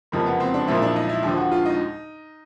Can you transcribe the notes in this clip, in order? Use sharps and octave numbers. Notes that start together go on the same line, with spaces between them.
F#1 F2 C3 F3 A#3
B3
C4
D4
B1 A#2 F3 E4
D4
D#4
E4
D#2 D3 F3
F#4
F4
D#4